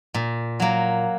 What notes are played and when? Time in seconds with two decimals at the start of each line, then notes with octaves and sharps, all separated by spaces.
0.14 A#2
0.60 F#3 A#3